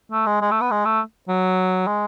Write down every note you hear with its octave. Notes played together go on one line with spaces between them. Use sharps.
A3
G#3
G#3
A3
B3
G#3
A3
F#3
G#3